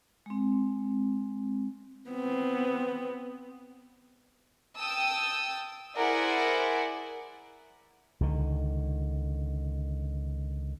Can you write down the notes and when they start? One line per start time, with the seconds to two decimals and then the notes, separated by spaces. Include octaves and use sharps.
0.26 G#3 C4
2.09 B3 C4
4.78 G5 A5 D#6 E6
5.97 E4 G#4 A#4 C5 D5 F#5
8.20 C#2 D3 D#3